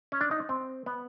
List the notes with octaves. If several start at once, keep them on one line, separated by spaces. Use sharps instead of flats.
C#4
D4
D#4
C4
B3